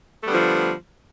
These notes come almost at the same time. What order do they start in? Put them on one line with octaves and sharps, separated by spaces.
A3 G3 B3 D3 F3